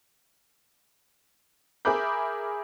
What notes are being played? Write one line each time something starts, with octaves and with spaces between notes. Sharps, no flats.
G#4 A#4 E5 B5 D6 G6